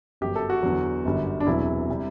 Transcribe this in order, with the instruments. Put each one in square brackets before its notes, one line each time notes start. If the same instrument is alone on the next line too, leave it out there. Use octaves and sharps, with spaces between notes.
[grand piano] G1 F#2 F#3 G4
A4
F#4
E2 D3 F#3
G1 F#2 D3 G3
D4
E1 E2 C3 F#3 E4
C3 G3